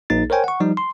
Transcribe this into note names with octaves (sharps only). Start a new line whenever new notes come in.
A#1 A#3 D#4 A6
A#4 C5 C#5 G5 G#5
F#5 C#6
F3 G3 D#4
C6